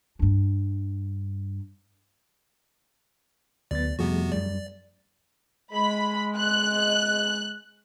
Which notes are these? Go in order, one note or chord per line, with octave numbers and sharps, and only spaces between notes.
G2 D4
D2 F#3 B3 D5 A6
F2 C3 F3 G3 A3 B3 F#4 G#4
F#2 G3 D5
G#3 B5
F#6